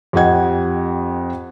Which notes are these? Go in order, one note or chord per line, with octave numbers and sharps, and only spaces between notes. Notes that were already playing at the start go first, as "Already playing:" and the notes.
F2 G4 D#5 F#5 G#6